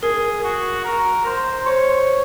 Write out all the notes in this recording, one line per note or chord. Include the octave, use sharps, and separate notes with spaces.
G#4 A#4
F#4
A#4
C5
C5 C#5